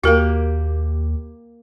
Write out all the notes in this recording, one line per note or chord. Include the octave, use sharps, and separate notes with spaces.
D#2 A#3 F#4 G4 A#4